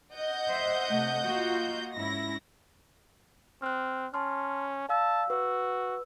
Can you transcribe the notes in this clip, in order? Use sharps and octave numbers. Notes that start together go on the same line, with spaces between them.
D#5 F#5 G6
C5 E5
C3 A3
A#3 F4 F#4
G#2 C#4 E4 A#6
C4 F6 F#6
C#4 A5 C6 F6
D5 F5 A5 E6
F#4 B4 E6